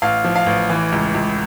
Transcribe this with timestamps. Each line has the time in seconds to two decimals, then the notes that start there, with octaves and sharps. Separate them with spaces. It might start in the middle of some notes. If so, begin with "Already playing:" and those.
0.02 A1 F5
0.24 F3
0.36 F5
0.46 A1
0.70 E3
0.92 C#2
1.15 C#2